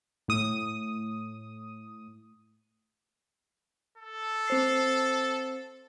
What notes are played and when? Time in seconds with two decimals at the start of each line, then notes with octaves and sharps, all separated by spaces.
0.28 A2 D#6
3.98 A4
4.48 C4 C5 C7